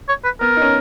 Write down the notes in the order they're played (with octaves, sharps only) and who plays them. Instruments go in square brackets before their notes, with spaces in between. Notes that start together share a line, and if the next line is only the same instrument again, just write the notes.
[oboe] C#5
B4
[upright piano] B3 [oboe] A#4
[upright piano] D#4
C#4